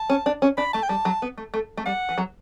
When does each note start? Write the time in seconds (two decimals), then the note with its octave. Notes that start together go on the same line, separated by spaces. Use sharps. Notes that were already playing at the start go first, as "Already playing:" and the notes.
Already playing: A5
0.10 C#4
0.26 D4
0.42 C#4
0.57 D4 B5
0.73 A3 A5
0.83 G5
0.89 G3 A5
1.05 F#3
1.22 B3
1.38 A3
1.54 A3
1.77 A3
1.86 G3 F#5
2.09 E3
2.18 F#3